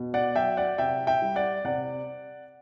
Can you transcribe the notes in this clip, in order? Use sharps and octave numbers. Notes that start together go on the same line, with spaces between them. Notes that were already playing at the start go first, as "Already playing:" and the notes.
Already playing: B2
D5 F#5
F#3 E5 G5
D5 F#5
C3 E5 G5
E5 G5
G3
D5 F#5
C3 D5 F#5